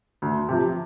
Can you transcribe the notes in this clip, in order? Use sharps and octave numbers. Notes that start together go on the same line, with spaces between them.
D2
C3 F3